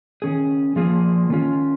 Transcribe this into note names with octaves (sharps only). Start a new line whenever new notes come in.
D#3 C#4 G#4
F3 A#3 F4 G#4
D#3 C#4 F4